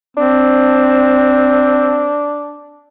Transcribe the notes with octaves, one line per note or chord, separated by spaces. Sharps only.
C4 D4